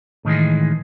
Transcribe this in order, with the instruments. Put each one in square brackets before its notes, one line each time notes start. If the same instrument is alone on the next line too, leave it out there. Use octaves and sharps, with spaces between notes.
[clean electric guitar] A2 D#3 E3 G#3